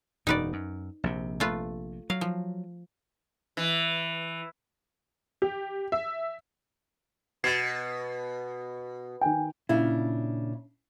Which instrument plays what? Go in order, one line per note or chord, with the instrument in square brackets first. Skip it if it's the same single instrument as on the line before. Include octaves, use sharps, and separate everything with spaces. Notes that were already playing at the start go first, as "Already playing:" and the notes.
[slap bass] E1 F#2 [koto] D#4 B4 D5
[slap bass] F#2
A#1 C3
[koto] A3 F4 B4
[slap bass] F#3 [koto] F5
[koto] F3
[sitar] E3
[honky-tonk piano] G4
E5
[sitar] B2 [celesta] G#6 A6 [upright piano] C7
[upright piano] D#3 G5 [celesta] G#5
[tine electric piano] A#2 A#3 [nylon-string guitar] C#3 D4 F5 [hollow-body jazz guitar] E4